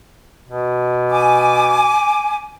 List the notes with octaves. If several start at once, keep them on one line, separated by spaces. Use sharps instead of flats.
B2
G#5 D6